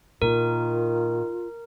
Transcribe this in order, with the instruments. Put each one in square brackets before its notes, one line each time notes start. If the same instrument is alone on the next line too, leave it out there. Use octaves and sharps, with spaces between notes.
[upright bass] A#2 [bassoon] D#3 [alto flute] F4 [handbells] A#4